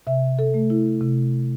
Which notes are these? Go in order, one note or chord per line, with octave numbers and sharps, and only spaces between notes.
C3 E5
A4
A3
E4
C3